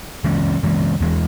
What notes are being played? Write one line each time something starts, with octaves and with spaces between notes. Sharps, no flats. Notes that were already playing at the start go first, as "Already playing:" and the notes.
C#3 E3 G#3 C#4
C#3 E3 G#3 C#4
E2 E3 G#3